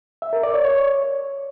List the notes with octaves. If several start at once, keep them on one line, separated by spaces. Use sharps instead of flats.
E5
A#4
D5
C#5
C#5